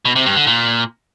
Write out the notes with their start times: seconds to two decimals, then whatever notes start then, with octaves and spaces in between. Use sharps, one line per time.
0.05 B2
0.16 C3
0.26 G2
0.36 D3
0.47 A#2